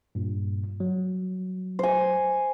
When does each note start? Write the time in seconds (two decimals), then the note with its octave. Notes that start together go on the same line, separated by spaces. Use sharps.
0.15 G2 A#2
0.80 F#3
1.79 C5 G#5